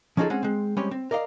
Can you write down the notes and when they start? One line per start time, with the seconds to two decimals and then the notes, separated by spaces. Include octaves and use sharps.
0.17 F3 C#4 D#4 F4 G#4 A4
0.30 G#3 C4 C#4 F#5
0.43 G#3 C4
0.77 G3 G#3 C4 C#4 G4 C#5
0.91 C4
1.11 A#4 D5 D#5 F5